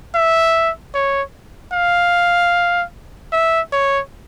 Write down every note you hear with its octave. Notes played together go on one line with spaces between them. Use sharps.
E5
C#5
F5
E5
C#5